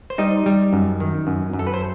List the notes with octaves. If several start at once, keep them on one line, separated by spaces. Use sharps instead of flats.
C5
G3 D#4 D#5
G3
F#2
D#3
F#2
F#2
A4
B4
C5